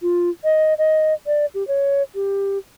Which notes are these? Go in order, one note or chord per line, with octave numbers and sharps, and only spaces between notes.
F4
D#5
D#5
D5
G4
C#5
G4